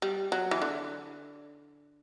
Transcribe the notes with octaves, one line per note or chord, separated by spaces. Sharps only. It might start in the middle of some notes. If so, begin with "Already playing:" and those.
G3
F#3
E3
D3